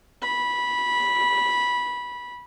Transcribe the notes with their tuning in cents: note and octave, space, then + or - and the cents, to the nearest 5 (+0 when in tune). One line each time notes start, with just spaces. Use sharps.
B5 -15